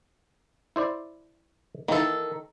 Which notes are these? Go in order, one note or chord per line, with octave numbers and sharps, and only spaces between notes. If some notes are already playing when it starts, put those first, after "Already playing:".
E4 C5 D5
D#3 E3 A#3 A4